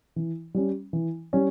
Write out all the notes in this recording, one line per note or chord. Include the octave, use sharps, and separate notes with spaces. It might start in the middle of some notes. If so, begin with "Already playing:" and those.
E3
G3 C#4
E3
G3 C#4